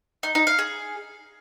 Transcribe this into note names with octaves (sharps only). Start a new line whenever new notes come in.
D#4
D#4
F5
G#4